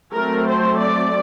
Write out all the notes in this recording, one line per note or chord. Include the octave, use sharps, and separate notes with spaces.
F#3 A3 C4 A#4
C5
D5